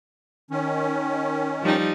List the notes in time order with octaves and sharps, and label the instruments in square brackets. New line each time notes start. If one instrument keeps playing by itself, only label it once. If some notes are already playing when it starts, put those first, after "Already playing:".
[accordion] D#3 C#4
[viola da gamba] F3 G3 D#4